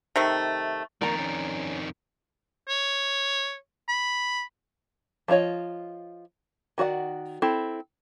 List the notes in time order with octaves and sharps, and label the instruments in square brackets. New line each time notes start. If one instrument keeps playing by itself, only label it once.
[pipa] C3 D#3 A3
[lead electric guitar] F2 D#3 [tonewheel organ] A#3 A#4 C#6 [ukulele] D5 A#5
[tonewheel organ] C#4
[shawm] C#5
B5
[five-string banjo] F3 E4 F4 C#5 D#5
D#3 F#4 D5 F#5
C4 E4 A4